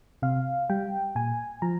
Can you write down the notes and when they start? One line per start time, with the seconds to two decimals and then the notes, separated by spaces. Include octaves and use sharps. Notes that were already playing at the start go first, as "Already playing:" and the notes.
0.22 C3 F5
0.70 G3 G5
1.15 A#2 G#5
1.62 F3 A#5